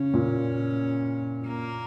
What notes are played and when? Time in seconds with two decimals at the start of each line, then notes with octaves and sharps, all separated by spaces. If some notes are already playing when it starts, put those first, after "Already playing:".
Already playing: C#3 C#4
0.14 A#2
1.47 A#3